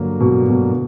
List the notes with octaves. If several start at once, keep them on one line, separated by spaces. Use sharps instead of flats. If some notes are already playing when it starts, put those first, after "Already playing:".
Already playing: G2 D3 F#3 A#3
B2
B2